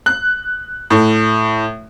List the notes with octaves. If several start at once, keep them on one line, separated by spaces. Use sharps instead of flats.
F#6
A2